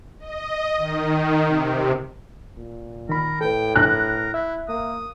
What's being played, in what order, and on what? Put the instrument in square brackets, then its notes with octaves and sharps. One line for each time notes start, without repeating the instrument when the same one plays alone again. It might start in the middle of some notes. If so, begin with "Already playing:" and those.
[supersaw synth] D#5
D#3
C3
[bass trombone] A#2
[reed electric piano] D#3 B5 [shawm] A#4
[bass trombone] A2 [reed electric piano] A4 B4 [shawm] G5
[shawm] A#4 [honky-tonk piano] F#6
[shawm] E4 [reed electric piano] E5
[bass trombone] A#3 [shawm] D#6